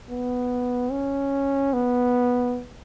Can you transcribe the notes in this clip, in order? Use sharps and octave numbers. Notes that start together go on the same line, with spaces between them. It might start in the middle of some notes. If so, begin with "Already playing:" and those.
B3
C#4
B3